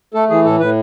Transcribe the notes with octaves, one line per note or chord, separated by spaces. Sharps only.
A3 A4
E3 G#4
A2 A4
A2 B4